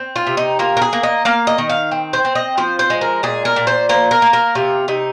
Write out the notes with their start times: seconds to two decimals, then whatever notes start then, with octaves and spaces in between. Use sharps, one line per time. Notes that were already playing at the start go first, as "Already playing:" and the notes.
Already playing: C4
0.16 F4
0.27 C3
0.37 D#4
0.59 A#3 F4
0.77 A#4
0.82 G#4
0.93 A#3
1.03 D#5
1.25 A#3 F5
1.47 D#5
1.58 D#3
1.69 F5
1.91 C4
2.13 C5
2.25 C4
2.35 D#5
2.57 F3 C5
2.79 C5
2.90 G#3
3.01 A#4
3.23 A#2 G#4
3.45 A#4
3.56 A#2
3.67 C5
3.89 A#3 C5
4.11 A#4
4.22 A#3
4.33 A#4
4.55 C3 F4
4.88 C3 D#4